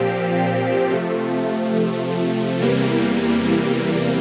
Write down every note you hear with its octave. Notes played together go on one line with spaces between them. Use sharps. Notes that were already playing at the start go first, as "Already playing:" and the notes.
Already playing: A#2 F3 C4 G4
C3 F3 A3
E2 C3 E3 G3 A#3